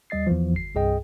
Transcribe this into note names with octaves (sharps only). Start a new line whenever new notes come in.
D#2 G3 D#5 A6 C7
E2 E3 F3
G1 C7
C2 G2 G#4 D#5 G5